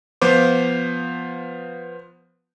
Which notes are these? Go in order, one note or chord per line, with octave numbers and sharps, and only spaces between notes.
F3 B3 F4 C5 D6